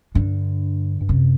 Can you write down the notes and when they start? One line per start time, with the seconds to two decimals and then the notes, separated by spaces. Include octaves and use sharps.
0.15 G2 D3
1.01 G2
1.08 F#2 C3